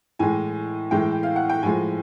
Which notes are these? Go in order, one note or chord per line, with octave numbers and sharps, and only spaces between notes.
A2 E3 G#3 G#5
A2 E3 G#3 G5
F5
F#5
G5
A2 F3 G#3 G#5